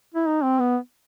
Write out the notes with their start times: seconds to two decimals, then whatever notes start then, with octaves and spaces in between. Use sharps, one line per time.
0.14 E4
0.27 D#4
0.43 C4
0.60 B3